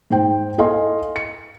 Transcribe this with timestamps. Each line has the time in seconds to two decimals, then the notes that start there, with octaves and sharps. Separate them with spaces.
0.10 G#2 C5 G5
0.58 E4 A4 D#5 F5 G#5 C6
1.16 C#7